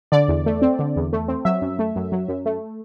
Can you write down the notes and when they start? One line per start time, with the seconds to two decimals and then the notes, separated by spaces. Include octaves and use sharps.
0.12 D3 D5
0.28 E2
0.46 A3
0.62 C4
0.79 D3
0.96 E2
1.13 A3
1.28 C4
1.45 F#3 E5
1.62 F#2
1.79 A3
1.96 F#2
2.12 F#3
2.28 F#2
2.46 A3